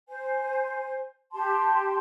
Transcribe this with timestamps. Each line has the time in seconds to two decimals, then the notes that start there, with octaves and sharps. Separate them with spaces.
0.09 C5 G#5
1.33 G4 A5 C6